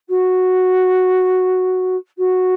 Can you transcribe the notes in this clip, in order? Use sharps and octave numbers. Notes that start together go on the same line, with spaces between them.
F#4
F#4